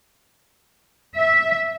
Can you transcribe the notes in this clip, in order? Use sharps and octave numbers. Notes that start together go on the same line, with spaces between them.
E5